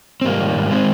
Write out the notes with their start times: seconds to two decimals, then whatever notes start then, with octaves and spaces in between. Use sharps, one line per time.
0.21 C4
0.25 G#2 G3 A#3
0.40 D#3
0.56 G#2
0.70 D#3 G#3 C4